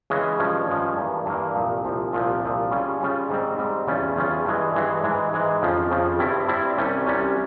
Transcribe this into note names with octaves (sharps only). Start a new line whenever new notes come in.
C#3 E3 G#3 C#4
G2 F3 G#3 C#4
G2 F3 G#3 C#4
G2 E3 A#3
G2 E3 A#3
C2 A#2 F3
C2 A#2 F3
C2 A#2 F3
C2 A#2 F3
C#3 G3 C#4 F4
C#3 G3 C#4 F4
G#2 G3 C4
G#2 G3 C4
E2 C#3 G3 C#4 F4
E2 C#3 G3 C#4 F4
G2 E3 G#3
G2 E3 G#3
G#2 E3 G#3
G#2 E3 G#3
F2 C#3 F3
F2 C#3 F3
G2 G3 C4 E4
G2 G3 C4 E4
C2 C3 G3 C#4
C2 C3 G3 C#4